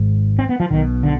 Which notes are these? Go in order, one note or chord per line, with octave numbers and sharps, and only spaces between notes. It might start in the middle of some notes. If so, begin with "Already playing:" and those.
Already playing: G#1 G#2
C4
B3
F3
B1 B2 D#3
D3